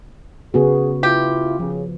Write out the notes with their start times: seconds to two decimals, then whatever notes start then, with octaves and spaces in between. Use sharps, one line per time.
0.54 C#3 B3 F#4 G#4
1.03 E4 F4 G4
1.60 C#3 F3